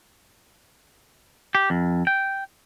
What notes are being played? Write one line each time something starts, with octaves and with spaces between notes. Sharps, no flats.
G4
F2
G5